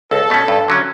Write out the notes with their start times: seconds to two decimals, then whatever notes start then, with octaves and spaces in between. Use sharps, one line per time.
0.11 C#2 A4
0.30 B2 A3 C#4
0.48 G2
0.68 D3 F#3 C#4